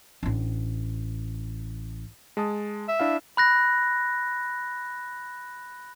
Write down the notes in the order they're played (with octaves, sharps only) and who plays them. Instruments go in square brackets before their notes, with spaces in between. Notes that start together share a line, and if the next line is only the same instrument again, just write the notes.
[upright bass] A1 D4
[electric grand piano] G#3 A5 D#6
[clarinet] E5
[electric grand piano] D4 E4 F5
[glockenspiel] B5 F#6 A#6